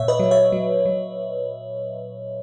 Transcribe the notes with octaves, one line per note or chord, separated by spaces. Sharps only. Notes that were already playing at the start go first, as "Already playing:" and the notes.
Already playing: A#2 C#5 E5
B4 D#5
F#3
C#5 E5
F#3
F#3